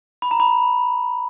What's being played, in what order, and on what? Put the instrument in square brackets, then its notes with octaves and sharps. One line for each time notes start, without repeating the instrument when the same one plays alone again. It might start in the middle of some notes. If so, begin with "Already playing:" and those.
[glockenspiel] B5
A#5
B5